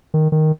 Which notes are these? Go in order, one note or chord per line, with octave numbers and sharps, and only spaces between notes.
D#3
D#3